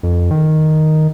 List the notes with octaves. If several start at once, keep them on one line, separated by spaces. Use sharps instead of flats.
F2
D#3